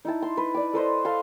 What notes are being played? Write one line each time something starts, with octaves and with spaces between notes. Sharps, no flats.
D#4 E4 A5
C6
B4
D5 D6
A4 B4 C5 D#5
A4 F5 C6